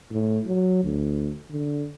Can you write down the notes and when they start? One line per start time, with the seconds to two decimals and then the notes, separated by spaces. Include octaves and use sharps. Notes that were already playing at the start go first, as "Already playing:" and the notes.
0.11 A2
0.46 F#3
0.84 D2
1.50 D3